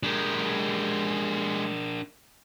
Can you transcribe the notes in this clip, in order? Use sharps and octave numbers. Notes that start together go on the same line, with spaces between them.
G#3 D4 G4 A#4